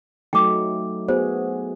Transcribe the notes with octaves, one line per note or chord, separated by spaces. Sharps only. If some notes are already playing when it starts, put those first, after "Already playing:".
F#3 A3 D#4 G5 D6
B3 F#4 G#4 C5